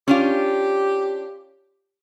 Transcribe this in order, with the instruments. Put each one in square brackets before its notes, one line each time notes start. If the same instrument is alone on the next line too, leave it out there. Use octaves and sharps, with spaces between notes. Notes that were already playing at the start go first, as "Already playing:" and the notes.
[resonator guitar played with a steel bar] C#4 D4 F4 [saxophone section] G4